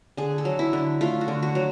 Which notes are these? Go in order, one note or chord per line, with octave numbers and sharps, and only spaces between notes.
D3 G#4
A4
F#3
E4
D3
A3 F4
F#4
D3
F#4
F#3